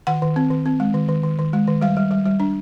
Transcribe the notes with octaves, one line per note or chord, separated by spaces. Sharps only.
D#3 F#5
D#3
C4
D#3
C4
G#3
D#3
D#3
D#3
D#3
G#3
D#3
G3 F5
G3
G3
G3
D4